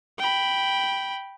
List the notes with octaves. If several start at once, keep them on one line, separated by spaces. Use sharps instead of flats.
G5 B5